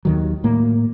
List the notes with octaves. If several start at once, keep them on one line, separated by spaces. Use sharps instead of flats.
D#2 D#3 F#3
A2 A#3